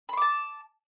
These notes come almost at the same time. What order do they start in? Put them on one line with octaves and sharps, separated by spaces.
B5 C6 D6 A5